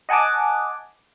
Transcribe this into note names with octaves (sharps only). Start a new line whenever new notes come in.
D#5 F#5 G#5 A5 D6